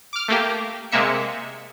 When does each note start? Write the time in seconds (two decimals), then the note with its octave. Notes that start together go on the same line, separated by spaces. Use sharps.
0.13 D6 F6
0.28 A3 A#3 G4
0.92 C3 G#3 A#3 E5 C#7